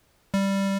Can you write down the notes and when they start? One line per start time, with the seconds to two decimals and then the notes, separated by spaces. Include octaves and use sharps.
0.34 G3